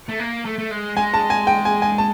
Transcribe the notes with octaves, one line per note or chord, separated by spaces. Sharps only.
A3
A#3
A3
A3
G#3
G#3 G#5
A5
G#5
G5
G#5
G#5
A5